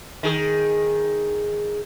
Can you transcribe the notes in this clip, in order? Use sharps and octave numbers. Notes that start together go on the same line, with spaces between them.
D#3 G#4